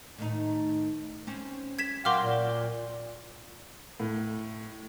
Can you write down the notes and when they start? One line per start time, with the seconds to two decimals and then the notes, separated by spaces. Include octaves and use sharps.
0.18 A2 D#3 D#4
1.27 C4 C#4 C5
1.79 G#6 B6 E7
2.05 F#3 F#4 A#4 F5 G5 C6 D6 F6
2.21 A#2
4.00 A2